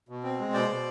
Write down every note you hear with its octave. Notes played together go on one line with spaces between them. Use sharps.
B2
C4
G#3
B2 C5 D5
B2